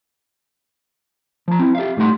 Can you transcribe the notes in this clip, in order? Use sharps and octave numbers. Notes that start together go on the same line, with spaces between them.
F3 A#5
C4 E4
G4 E5 F5
A2 G3 A3 D#4 F#5 C6